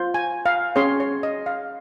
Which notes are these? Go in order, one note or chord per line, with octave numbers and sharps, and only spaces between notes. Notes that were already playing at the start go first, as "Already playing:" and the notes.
Already playing: F4 C5
G#5
F5
C#4 G#4 C#5 C6
C#5
D#5
F5